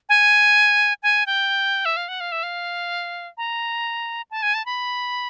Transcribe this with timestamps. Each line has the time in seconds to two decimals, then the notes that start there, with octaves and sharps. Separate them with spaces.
0.09 G#5
1.03 G#5
1.26 G5
1.85 E5
1.97 F5
2.08 F#5
2.20 F5
2.32 E5
2.43 F5
3.37 A#5
4.31 A5
4.43 G#5
4.54 A5
4.66 B5